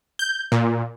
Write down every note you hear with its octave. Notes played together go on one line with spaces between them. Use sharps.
G6
A#2